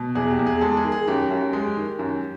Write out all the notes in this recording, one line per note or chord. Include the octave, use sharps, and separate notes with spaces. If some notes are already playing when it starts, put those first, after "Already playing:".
Already playing: B2
E2 G#4
G4
E2
G#4
G#3 A4
G#4
D#3
G#4
F#2 G4
F#2
G#3
D#3
F#2